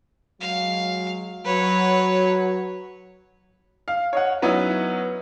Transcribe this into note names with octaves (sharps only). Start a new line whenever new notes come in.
F#3 G#3 F5
F#3 B4 C#5
F5
C#5 D#5 F#5
F#3 B3 C#4 D#4 E4